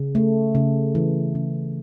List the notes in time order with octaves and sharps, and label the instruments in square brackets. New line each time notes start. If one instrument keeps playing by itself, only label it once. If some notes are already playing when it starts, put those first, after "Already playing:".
Already playing: [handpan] C#3
A3
C#3
E3
C#3